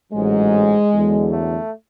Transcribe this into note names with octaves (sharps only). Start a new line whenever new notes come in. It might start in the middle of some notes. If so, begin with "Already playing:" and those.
A1 G#2 F#3 G#3
E2 D3 F#3
A3